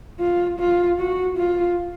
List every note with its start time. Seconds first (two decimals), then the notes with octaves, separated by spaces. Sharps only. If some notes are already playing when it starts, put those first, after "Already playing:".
0.20 F4
0.59 F4
0.99 F#4
1.37 F4